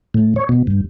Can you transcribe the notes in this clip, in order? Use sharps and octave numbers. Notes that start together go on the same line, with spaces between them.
A2
C#5
B2
G2